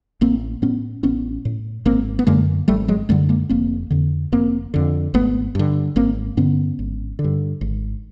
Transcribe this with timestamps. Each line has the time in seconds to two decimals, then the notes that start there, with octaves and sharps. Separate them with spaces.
0.21 A1 A#3 C4
0.62 A2 B3 C#4
1.03 A1 B3 C#4
1.45 A2
1.85 G#1 A#3 C4
2.19 B3
2.27 F#2 D3 G#3 A#3
2.68 G#1 G3 A3
2.88 F#3 G#3
3.09 F#2 D3 G3 A3
3.29 G#3 A#3
3.49 F1 A#3 C4
3.91 F2 D3
4.32 F1 A#3 C4
4.74 F2 D3
5.14 G#1 A3 B3
5.55 G2 D3
5.96 G#1 A#3 C4
6.37 G2 D3 B3 C#4
6.79 G#1
7.19 D3
7.24 G2
7.61 G#1